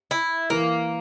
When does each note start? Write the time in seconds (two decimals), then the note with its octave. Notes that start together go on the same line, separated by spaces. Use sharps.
0.11 E4
0.50 E3 A#3